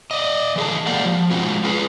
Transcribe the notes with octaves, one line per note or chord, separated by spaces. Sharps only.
D5 D#5
E3 G#4 A4
G#3 A#3 G4 D5 F5 F#5
F3
G#3 C4 F4 F#4
F4 G#4 B4